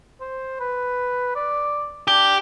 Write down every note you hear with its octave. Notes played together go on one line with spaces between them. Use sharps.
C5
B4
D5
D4 G4